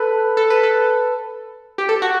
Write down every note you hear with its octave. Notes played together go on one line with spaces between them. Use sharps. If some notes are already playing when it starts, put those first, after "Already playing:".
Already playing: A4 B4
A4
B4
A4
G4
A4
F#4